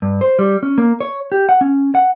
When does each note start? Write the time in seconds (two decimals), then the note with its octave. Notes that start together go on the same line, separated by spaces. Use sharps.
0.02 G2
0.21 C5
0.39 G3
0.63 C#4
0.78 A#3
1.00 C#5
1.32 G4
1.49 F#5
1.61 C#4
1.95 F#5